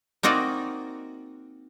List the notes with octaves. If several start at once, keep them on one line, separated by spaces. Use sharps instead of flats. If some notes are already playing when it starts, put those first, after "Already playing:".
A#3 C4 D#4 F#4 D5